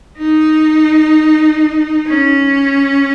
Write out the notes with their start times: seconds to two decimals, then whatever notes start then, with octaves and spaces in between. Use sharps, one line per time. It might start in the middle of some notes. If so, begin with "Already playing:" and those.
0.18 D#4
2.08 C#4